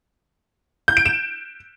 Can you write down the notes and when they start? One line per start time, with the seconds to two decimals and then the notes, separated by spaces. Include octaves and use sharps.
0.88 G6
0.97 D7
1.06 E7